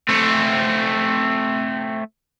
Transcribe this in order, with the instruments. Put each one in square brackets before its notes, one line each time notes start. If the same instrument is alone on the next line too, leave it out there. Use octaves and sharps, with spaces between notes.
[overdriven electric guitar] A3 C4